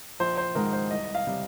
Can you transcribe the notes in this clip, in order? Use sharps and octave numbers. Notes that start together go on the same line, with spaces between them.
A#1 C5
C5
G#2 D#3 G#3 A#4
C5
C2 D#5
F5
C3 G3